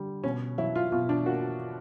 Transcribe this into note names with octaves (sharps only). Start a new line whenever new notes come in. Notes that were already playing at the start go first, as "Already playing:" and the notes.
Already playing: D3 G3
B2 C#4
F#3 E4
F4
B2 F4
D4
A#3 F#4